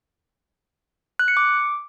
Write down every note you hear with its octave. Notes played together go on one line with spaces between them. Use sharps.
F#6
C#7
D6